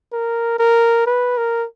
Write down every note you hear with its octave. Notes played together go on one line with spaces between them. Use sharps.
A#4
A#4
B4
A#4